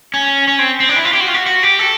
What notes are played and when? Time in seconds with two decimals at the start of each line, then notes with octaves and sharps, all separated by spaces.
0.14 C#4
0.48 C#4
0.59 C4
0.80 C4
0.89 D4
0.96 E4
1.05 F4
1.13 G4
1.20 F#4
1.28 F4
1.34 F#4
1.46 F#4
1.63 G4
1.79 A4